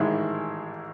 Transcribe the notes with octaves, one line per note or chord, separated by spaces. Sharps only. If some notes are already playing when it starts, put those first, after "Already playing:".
Already playing: A1 G#2 D#3 G#3 E4